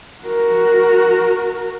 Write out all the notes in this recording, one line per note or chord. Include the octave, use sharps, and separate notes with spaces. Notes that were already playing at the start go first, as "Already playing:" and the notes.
F#4 A#4